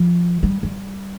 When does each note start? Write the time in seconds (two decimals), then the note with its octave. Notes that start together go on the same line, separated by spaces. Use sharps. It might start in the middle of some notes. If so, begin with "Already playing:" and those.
Already playing: F3
0.43 G3
0.63 G3